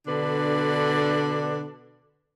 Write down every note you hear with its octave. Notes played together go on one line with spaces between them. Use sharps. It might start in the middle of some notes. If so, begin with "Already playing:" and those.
B2 D3 D4 A4 B4